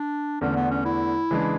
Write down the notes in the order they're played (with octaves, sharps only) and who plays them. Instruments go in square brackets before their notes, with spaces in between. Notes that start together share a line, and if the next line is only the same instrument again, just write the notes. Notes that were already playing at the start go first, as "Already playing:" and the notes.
Already playing: [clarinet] D4
[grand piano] E2 D3 A3 [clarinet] C#4
[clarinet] B3
C#4
E4
[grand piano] C#3 E3 G#3 D4